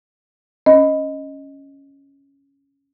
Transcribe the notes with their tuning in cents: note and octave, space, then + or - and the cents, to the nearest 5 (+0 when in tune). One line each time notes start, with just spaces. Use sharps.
C#4 +0 D#5 +0